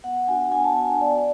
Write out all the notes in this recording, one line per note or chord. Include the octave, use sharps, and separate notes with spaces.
B3 F#5
D4 F#4 G#5
B3 G#5
A5
D4 F#4 G#5
B3 D5